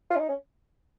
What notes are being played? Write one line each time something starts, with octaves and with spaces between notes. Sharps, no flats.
F4
C#4
D#4
C#4